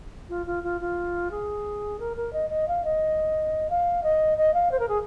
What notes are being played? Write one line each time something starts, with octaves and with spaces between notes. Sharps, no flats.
F4
F4
F4
F4
G#4
A#4
A#4
D#5
D#5
F5
D#5
F5
D#5
D#5
F5
C5
A#4
G#4